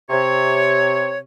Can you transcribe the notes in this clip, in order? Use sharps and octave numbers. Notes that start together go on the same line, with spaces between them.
C3 C#5